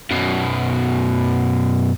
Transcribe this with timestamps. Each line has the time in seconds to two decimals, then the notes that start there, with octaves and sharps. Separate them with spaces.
0.11 F#2 B2